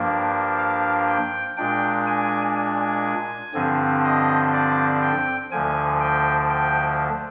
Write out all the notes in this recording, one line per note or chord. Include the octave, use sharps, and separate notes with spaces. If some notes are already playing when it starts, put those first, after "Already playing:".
Already playing: G2 F3 A#3 D4
F5
G5
A#2 G#3 D4 G5
G#5
G#5
G2 D3 F3 C4
D#5
D5
G5
D2 D3 F3 G#5
G5
G5